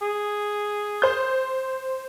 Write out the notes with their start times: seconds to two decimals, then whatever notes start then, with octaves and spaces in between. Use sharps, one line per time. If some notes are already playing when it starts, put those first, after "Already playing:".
0.02 G#4
1.02 C5 G6